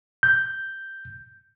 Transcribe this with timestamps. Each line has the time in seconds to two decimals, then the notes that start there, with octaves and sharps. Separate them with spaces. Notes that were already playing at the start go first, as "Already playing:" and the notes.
0.23 G6